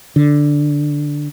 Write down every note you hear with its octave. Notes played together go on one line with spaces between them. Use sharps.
D3